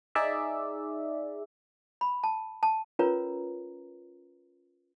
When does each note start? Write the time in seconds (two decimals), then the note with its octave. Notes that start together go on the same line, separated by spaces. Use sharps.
0.15 D#4 G#4 D5 E5
2.01 B5
2.24 A5
2.63 A5
2.99 C#4 F4 A#4 B4 C#5 A#5